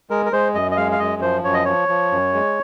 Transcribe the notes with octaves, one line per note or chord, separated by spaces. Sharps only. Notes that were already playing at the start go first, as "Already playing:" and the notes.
G#3 A#4
A#4
G#3 C5
F#2 D#5
D#5
G#3 F5
F5
F#2 D#5
F3 C5
F#2 C#5
D#5
F3 C#5
F3
F#2
G#3